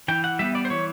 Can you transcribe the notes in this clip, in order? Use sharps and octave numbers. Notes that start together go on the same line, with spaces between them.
E3 G5
F#5
G3 B3 E5
D5
C5
E3 C#5